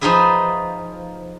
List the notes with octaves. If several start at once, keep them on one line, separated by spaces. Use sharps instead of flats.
F3 D#4 F4 G#4 B4 E5